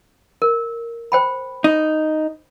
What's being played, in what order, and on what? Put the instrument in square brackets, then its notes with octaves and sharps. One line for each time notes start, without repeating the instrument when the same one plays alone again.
[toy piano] A#4
C5 G5 B5
[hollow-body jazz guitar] D#4